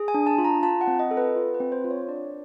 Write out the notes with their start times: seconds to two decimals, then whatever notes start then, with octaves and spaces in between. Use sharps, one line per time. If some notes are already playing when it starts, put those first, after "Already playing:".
Already playing: G#4
0.08 G#5
0.14 D4
0.27 A5
0.38 F4
0.44 A#5
0.63 F4 A5
0.81 F#5
0.87 C4
0.99 D#5
1.11 A4
1.17 B4
1.36 F4
1.55 B4
1.60 C4
1.72 C5
1.84 F4
1.91 C#5
2.08 D4 D5